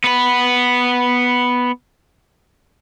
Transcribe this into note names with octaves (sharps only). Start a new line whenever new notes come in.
B3 B4